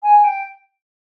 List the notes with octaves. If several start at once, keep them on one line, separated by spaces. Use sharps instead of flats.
G#5
G5